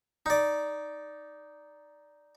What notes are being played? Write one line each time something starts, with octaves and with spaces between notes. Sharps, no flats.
D#4 D5